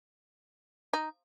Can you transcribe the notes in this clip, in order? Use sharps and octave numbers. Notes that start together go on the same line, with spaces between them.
D#4